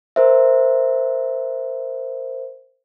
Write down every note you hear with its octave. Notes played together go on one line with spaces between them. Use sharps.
A#4 C5 E5